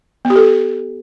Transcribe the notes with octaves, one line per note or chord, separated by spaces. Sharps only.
B3
G4
A4